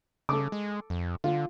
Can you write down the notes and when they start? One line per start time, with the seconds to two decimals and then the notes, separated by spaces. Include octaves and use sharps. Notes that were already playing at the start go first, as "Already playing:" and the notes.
0.29 C#3 A4 D6
0.52 G#3
0.90 F2
1.24 D3 F4